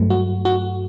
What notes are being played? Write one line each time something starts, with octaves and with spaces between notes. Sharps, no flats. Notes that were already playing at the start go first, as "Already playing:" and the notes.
Already playing: G2 F#3 A3
F#4
F#4